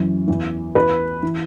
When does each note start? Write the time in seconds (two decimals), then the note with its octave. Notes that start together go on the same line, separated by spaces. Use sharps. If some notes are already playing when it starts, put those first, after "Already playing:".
Already playing: F#2 E3
0.28 E2 E3
0.75 E2 E3 B4
1.23 E3